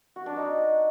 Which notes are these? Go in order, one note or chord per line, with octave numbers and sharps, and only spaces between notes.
F#4
D4
D#4